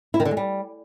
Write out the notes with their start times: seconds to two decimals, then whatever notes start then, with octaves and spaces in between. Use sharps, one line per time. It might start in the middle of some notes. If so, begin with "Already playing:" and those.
0.14 E4
0.20 D#3
0.25 D3
0.31 G#3
0.37 G3